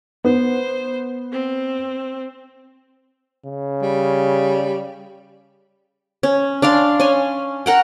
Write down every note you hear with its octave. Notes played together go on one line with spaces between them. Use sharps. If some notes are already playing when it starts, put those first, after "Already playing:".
B3 C5
C4
C#3
G3
C#4
D4 D5 F5 C6
C#4 G#5 C6
A#4 F#5 G5